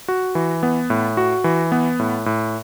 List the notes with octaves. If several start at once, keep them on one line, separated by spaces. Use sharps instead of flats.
F#4
E3
B3
A2
F#4
E3
B3
A2
A2